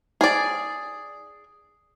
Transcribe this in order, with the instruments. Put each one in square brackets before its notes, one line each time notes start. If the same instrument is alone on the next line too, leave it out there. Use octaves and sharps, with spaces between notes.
[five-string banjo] G#4 D5